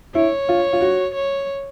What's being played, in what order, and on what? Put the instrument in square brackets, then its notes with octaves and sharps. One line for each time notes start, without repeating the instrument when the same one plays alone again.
[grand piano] E4 [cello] C#5
[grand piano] F4
F4
F#4
[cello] C#5